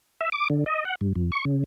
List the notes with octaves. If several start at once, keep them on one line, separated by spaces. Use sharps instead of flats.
E5
D6
D3
D#5
F#5
G2
F2
C#6
C#3